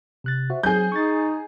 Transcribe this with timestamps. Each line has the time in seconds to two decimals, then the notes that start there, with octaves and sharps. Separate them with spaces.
0.24 C3 F#6 A6
0.50 F#4 C5 E5
0.63 F#3 C4 G#4 G6
0.92 D#4 C#6 A6